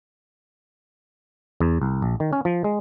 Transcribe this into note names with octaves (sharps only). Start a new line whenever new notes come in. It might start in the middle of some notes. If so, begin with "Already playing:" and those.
E2
C2
A#1
D#3
C#4
F3
G#3